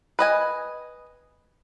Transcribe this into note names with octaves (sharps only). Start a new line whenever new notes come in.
B4 D#5 G#5